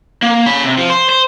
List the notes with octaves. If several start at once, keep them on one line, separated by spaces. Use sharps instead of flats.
A#3
C#4 B5
C3
F3
C5
C5